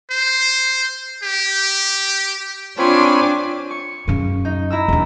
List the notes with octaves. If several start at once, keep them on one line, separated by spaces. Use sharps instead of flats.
C5
G4
C4 D4 F4 C#5 G#5 B5 D6
C#6
F#2 C#3
D#4
E4 A#5 E6
E2 D4